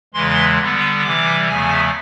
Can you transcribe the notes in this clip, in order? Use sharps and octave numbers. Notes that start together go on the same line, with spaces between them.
E2 C#3 E3 G#3 C6
D3 G3 B3
C3 E3 G3 D6
E2 C#3 F3 A3 G#5